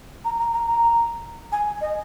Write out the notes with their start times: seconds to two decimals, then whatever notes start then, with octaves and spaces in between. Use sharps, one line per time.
0.25 A#5
0.39 A#5
0.53 A#5
0.67 A#5
1.52 G#5
1.81 D#5